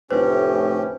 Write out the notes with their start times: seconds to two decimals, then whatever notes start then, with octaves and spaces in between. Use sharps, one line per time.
0.10 F1 D2 A2 C#4 G4 B4 C5